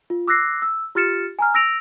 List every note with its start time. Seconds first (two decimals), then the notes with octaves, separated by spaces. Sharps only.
0.10 F4
0.28 D6 E6 F#6 A#6 C7
0.62 E6
0.95 F4 G4 F6 A6 C#7 E7
1.39 G#5 A#5 F6
1.54 E6 A#6 D7 F7